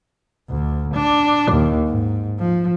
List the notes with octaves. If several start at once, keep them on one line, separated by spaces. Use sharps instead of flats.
D2
D4
D#2
G#2
F3